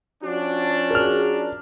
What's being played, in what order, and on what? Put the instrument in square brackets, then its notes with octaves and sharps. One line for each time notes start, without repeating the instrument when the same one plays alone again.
[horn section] F3 C#4 D4 [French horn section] F#4
[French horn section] F#4 G#4 [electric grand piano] A#4 F6